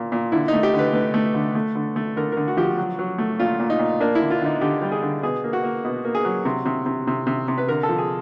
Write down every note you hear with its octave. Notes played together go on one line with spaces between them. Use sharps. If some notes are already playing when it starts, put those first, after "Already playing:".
Already playing: A#2 A#3
A#2
D3 E4
D#4
A3
G4
D3
B4
A3 B4
A3
D3
A3
D3
A3
D3 A#4
D3 A#4
F#4
F3 G4
F#4
F#3
F#3
A3
A#2 F4
A#2
D#4
A#2
A#3 D4
D3 E4
F4
D3 D#4
D3 G4
G3
G#4
D3
B2 G#4
A#3
F#4
A#3
B2
A#3
G#4
F#3
C3
C3
C3
C3
C3
C3
B4
D3 A#4
A4
F3
G#4